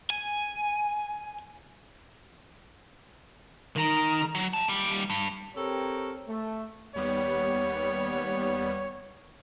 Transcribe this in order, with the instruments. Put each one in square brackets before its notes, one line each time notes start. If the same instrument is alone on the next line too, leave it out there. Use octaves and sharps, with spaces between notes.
[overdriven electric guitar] G#5
[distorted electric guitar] D#3 [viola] A#5
[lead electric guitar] F#3
F3 A5
D#2 G3
G2
[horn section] C4 G4 A4 A#4 C#5
A3
[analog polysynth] D#2 G3 B3 [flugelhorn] C#5